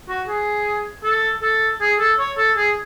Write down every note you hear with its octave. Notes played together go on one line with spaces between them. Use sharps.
F#4
G#4
A4
A4
G#4
A4
C#5
A4
G#4